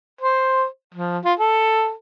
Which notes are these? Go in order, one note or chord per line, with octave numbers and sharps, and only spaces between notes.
C5
F3
F4
A4